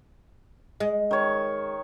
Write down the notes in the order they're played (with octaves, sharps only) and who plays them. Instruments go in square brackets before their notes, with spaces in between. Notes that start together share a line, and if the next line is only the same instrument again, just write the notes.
[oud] G#3
[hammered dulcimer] D#3 C#5